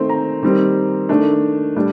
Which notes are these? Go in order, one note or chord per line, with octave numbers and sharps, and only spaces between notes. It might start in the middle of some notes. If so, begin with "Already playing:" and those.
Already playing: D#3 A3 C4
A#5
D#3 G3 C4
D#3 A3 D4
A2 G3 D4